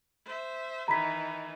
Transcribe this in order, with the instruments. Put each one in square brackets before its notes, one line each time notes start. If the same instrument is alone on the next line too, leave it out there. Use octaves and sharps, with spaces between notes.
[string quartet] C5 E5
[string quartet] D#3 E3 [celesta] A#5 B5 B6